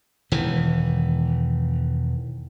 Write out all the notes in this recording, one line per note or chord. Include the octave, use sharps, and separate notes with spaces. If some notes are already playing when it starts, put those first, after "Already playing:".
E1 D#3 E3